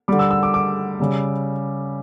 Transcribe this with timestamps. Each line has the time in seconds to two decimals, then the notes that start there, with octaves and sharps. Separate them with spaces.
0.08 D3 G3 D6
0.19 E6
0.31 E6
0.43 D6
0.54 D6
1.00 C#3 G3